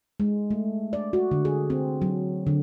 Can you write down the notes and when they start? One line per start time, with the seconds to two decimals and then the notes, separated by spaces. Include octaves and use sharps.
0.20 G#3
0.51 A3
0.93 D5
1.13 F#4
1.31 D3
1.45 G#4
1.70 C4
2.02 F#3
2.47 D3